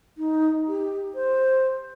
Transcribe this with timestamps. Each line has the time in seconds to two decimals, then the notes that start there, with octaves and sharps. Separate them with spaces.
0.18 D#4
0.68 G4
1.15 C5